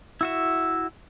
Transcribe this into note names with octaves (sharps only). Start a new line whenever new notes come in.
E4 F#4 E5